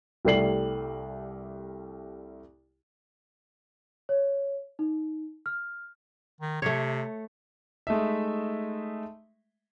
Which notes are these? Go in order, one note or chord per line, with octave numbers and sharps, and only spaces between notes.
C2 G3 A3 D5 C7 F#7
C#5
D#4
F6
D#3
C3 A3 C#5
G#3 A3 D#4 E5